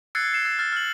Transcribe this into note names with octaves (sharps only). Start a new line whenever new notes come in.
E6 F#6 G#6 A6 C7 C#7
C7 E7
E6 A6
F6 A6
F6 F#7